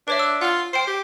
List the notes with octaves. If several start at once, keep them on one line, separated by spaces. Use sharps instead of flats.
D4 B4 C#5 E5
E6
F4 F#5 F6
C5 G5 C7
G4